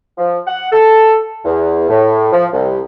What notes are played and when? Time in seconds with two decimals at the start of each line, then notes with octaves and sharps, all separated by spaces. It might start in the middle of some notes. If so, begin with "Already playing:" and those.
0.18 F3
0.47 F#5
0.72 A4
1.45 E2
1.89 A2
2.33 F3
2.54 C2